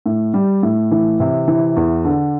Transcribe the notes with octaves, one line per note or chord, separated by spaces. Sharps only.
A2
G3
A2
E3
C3
E3
E2
D3